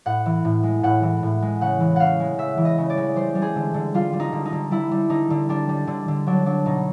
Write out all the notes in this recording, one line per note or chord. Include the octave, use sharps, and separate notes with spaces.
A2 F#5
E3
A2
G#3
A2 F#5
E3
A2
G#3
C#3 F#5
E3
C#3 F5 F#5
G#3
C#3 E5
E3
D#5
C#3
D5
G#3
G3 C5
G3
G#4
D3
D3
G3 F4
G3
D#4
D3
D#4
D3
G3 E4
G3
D3 D#4
D3
G3 D4
G3
D3
D3
F#3 D4
F#3 D4
B2 D#4